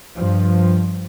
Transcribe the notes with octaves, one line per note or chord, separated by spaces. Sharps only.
G2 F3